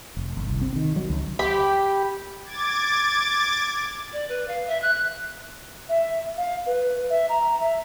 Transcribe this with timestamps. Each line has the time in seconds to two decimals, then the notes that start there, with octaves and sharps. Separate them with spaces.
0.17 F1
0.37 G1
0.50 C2
0.61 C4
0.76 D#3
0.96 F#3
1.10 C#2
1.39 G4 B5
2.45 D6 G#6 A6
4.13 D5
4.29 B4
4.48 F5
4.68 E5
4.82 F#6
5.89 E5
6.37 F5
6.66 B4
7.10 E5
7.29 A#5
7.60 E5